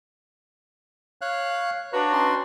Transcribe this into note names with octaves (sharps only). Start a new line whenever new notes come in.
C#5 F5 F#6
D4 F#4 B4 C#5 A#5
C#4 D#4 C6